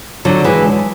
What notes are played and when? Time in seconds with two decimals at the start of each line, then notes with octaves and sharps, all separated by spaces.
0.25 D3 F#3
0.44 E3 G#3